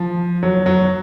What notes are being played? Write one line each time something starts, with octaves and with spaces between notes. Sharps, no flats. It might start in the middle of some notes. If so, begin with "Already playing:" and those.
Already playing: F3
F#3
F#3